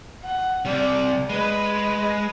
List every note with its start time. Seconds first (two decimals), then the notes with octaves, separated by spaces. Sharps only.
0.24 F#5
0.65 C3 G3 D5
1.30 G#3 B4